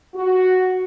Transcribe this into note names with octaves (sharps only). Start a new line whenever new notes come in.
F#4